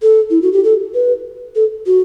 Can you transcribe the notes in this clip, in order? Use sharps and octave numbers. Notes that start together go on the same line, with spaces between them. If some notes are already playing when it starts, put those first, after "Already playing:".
A4
E4
F#4
G4
A4
B4
A4
F#4